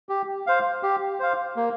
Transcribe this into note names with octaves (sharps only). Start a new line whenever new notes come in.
G4
C5 F5
G4
C5 F5
A#3